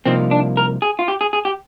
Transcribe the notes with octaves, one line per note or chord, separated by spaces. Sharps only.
C2 C3 F3 A#3 C4 D#4
D4
A#4
G#4
F4
G4
G#4
G#4
G4